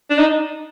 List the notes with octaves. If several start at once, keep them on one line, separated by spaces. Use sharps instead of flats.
D4
D#4